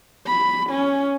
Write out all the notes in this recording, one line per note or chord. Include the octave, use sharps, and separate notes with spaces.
B5
C#4